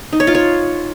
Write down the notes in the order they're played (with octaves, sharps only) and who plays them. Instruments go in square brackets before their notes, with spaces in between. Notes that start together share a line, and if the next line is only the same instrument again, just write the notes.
[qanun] D#4
C#5
F4
C#5